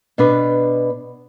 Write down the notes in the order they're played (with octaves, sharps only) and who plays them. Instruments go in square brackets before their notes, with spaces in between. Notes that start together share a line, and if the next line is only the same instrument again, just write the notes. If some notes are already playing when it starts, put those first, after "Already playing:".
[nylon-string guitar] B2 D4 B4